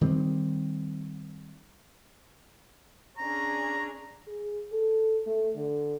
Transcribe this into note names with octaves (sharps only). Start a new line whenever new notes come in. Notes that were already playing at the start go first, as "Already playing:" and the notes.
D#3 G3 C4
C#4 D4 G#4 A#5
G#4
A4
A3
D3